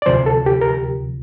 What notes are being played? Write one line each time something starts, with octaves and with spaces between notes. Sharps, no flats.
D5
D2 C3 F3 C5
A4
G4
A#4